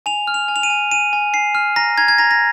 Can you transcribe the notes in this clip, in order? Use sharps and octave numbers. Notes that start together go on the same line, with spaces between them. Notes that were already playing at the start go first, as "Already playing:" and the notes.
G#5 F7
F6
F7
G#5
F7
D#7
G#5
G#5 D#7
G#5
G#5 C7
F6
A#5 A#6
A#5 G#6
G#6
A#5 A#6
A#6